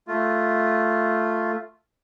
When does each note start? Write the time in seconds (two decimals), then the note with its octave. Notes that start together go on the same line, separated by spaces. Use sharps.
0.08 A3 F4